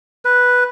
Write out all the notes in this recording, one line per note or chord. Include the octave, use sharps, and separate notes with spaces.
B4